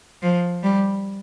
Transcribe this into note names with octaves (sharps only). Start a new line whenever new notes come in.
F3
G3